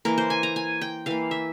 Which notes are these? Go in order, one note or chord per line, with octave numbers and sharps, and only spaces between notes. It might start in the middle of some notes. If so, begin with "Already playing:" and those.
E3 A#3 A#4
C5
G#5
A#5
G#5
G5
E3 A#3 F5
E5